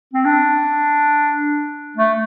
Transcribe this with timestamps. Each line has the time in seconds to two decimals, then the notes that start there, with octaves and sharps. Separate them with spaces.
0.13 C4
0.25 D4
1.97 A3